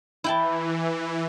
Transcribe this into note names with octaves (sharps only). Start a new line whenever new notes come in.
E3 E4 G5 A5